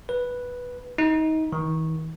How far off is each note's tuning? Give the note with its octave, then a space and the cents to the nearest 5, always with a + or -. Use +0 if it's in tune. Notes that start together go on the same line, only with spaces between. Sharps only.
B4 -5
D#4 +25
D#3 +45